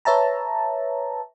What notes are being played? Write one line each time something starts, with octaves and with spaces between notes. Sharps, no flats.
B4 C#5 E5 A5 A#5